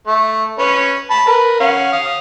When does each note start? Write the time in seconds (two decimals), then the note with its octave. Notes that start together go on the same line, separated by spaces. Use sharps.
0.07 A3
0.59 C#4 B4 C#5
1.10 A5 B5
1.27 A#4 B4
1.60 C#4 F5 F#5
1.93 F5 D#6